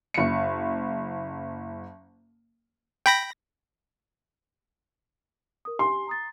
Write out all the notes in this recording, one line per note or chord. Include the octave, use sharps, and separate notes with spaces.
F#1 C#7
G5 B5 A#6
A#4 D#6
G4 G#5 C6
A#5 D#6 A6